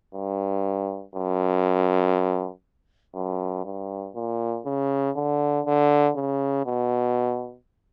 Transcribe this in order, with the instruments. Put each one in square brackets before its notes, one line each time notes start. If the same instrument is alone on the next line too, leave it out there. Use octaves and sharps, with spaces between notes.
[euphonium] G2
F#2
F#2
G2
A#2
C#3
D3
D3
C#3
B2